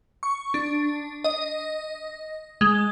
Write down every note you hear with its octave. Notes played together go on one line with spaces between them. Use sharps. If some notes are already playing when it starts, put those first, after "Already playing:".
C#6
D4
D#5
G#3